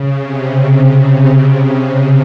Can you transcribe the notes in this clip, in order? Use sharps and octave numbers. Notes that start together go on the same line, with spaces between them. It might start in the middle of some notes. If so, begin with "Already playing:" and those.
Already playing: C#3
C3